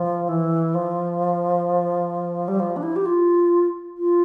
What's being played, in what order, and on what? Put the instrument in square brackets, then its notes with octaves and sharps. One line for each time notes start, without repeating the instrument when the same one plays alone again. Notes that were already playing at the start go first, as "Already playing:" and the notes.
Already playing: [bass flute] F3
E3
F3
G3
F3
D4
E4
G4
F4
F4